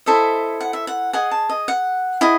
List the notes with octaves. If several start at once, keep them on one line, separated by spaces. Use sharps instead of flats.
E4 A4 C5 D#5 E5
F#5
E5
F#5
G#4 D#5 F#5
A5
D#5
F#5
E4 G#4 D#5